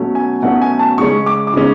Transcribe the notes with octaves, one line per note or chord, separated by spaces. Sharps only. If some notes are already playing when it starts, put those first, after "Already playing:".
Already playing: B2 F#3 A3 C#4
G#5
B2 F#3 A3 C#4 F#5
G#5
A5
C#3 G#3 C#4 C#6
D6
D6
C#3 G#3 C#4